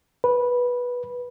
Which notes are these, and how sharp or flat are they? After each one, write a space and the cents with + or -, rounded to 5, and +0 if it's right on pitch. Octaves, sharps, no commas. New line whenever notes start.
B4 -10